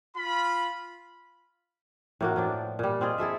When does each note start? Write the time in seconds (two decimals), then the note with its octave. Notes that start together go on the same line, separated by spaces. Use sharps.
0.17 F4 B5
2.21 A2 A#3 F#4
2.36 A2 F3 D4
2.79 A#2 G3
3.01 C4 F4 G#4 D#5
3.18 E4 G#4 A4 E5